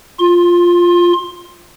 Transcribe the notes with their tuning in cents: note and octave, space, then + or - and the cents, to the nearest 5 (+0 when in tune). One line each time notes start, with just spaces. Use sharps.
F4 +0 C6 +25